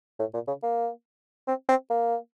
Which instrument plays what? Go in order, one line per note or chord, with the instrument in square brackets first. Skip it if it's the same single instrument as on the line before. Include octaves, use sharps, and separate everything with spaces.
[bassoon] A2
A#2
C#3
A#3
C4
C4
A#3